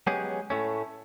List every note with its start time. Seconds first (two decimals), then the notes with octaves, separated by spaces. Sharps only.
0.07 F#3 G#3 B3 C#4 G4 G#4
0.50 A2 A3 C#4